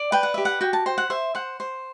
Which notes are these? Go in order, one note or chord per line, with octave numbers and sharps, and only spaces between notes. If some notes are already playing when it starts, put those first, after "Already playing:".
Already playing: D5
B4 G5
F#5
G4 E5
F#5
F#4 G5
A5
C5 G5
F#5
C5 E5
C5 F#5
C5